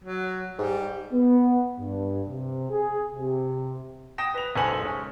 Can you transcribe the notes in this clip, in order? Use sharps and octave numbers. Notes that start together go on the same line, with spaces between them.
F#3
G#2 G3
B3
G2
C3
G#4
C3
G5 D#6 A#6 E7
B4 F7
F#1 B1 A4 C5 G#5 F#7
G#3 C#4